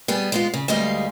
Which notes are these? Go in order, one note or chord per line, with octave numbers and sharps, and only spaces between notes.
G3 B3 G#4
G#3 B3 F4
C#3
D2 G3 G#3 B4 D#5 F5